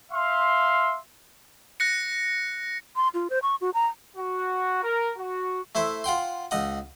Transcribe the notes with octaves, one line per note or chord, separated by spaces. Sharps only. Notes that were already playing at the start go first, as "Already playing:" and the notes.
E5 F5 C6
F#6 A#6 C#7
C6
F4
C5
C#6
F#4
A#5
F#4
A#4
F#4
A3 E4 C5
F4 F#5 G5 C6
C#2 D#5 F#5